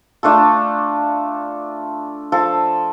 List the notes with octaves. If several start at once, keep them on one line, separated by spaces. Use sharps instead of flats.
A3 D4 F4 A4
F3 A4